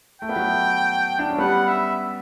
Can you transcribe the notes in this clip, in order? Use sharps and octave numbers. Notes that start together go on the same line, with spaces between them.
A3 G5
B3
F#3 A3
D4
C#4
G3 B3 F#5
E5